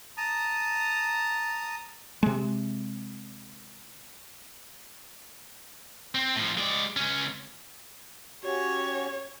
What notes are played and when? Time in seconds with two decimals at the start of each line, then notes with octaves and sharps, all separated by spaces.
0.17 A5 A#5 D#6
2.23 C3 G#3
6.15 C4
6.36 A2 F3
6.58 G#3 D5
6.97 C#2 C#4
8.44 C#4 F#4 G4 C#5